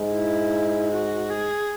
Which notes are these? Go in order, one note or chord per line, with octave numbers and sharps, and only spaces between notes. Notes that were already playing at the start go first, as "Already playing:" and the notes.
Already playing: G#2
E4
F#4
G#4